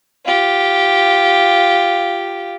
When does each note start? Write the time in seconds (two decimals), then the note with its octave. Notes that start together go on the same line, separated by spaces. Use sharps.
0.25 F4 G4